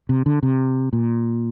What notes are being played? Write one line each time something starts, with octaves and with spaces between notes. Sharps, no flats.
C3
D3
C3
A#2